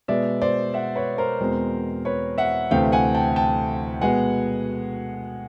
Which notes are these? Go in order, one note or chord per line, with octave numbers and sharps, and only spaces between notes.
B2 G#3 B3 D5 E5
C5 D5
E5 F#5
B4 C#5
A#4 C5
E2 B2 G#3 C4
B4 C#5
E5 F#5
D2 C3 E3 A3 C4 F5 G5
F#5 G#5
G5 A5
G5 A5
B2 G#3 B3 F#5 G#5